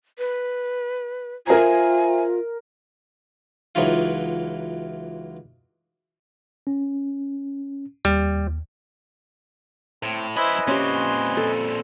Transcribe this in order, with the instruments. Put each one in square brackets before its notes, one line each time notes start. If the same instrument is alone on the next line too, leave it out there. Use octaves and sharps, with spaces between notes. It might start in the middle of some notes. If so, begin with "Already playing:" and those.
[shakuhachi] B4
[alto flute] F4 [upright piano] A#4 A#5 [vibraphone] C5 E5 [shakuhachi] G#5
[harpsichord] C#2 E3 F#3 D#4 F4 F5
[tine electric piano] C#4
[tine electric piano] D#2 [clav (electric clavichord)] G3
[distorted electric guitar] A2 [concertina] C4
[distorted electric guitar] F#2 B5 [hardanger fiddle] E4 C5 [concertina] B4 D#5 G#5
[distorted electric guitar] A#2 C4 [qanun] C#4 G4 [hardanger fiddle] C6
[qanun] A4